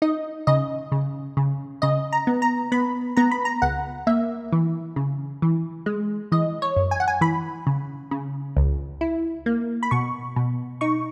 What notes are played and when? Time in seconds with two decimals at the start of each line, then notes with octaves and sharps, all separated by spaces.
0.02 D#4 D#5
0.47 C#3 D#5
0.92 C#3
1.37 C#3
1.82 C#3 D#5
2.13 A#5
2.27 B3
2.42 A#5
2.72 B3 B5
3.17 B3 A#5
3.31 B5
3.45 A#5
3.62 C#2 F#5
4.07 A#3 E5
4.52 E3
4.96 C#3
5.42 E3
5.86 G#3
6.32 E3 D#5
6.62 C#5
6.76 F#2
6.91 G#5
7.00 F#5
7.08 G#5
7.21 E3 B5
7.67 C#3
8.11 C#3
8.57 C#2
9.01 E4
9.46 A#3
9.83 B5
9.91 B2 C#6
10.36 B2
10.81 D#4 C#6